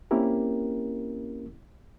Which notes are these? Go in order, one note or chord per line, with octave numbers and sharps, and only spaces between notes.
A#3 C4 C#4 E4 G4 A#4